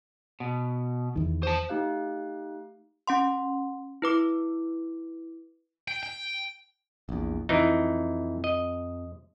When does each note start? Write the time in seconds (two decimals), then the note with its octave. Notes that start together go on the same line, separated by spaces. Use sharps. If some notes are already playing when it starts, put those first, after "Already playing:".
0.40 B2
1.16 E2 D#3
1.43 C5 A5
1.69 A3 D#4 G4 F5 F#6
3.07 C#4 F#5 C6
4.02 E4 B4 D6
5.88 G5
6.03 G5
7.09 A#1 E2
7.49 F2 E3 D#4
8.44 D#5